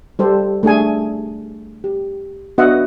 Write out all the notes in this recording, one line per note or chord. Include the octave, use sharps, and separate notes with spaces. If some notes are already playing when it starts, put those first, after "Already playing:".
G3 G4 A4 C5
A3 D4 G#4 G#5
G4
B3 D4 F#4 D#5 E5 F#5